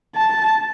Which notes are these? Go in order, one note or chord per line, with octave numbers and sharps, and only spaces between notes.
A5